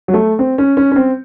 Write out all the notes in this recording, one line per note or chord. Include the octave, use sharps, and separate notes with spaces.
F#3
A3
C4
C#4
C#4
C#4
C4